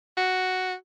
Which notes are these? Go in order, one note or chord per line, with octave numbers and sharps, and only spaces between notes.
F#4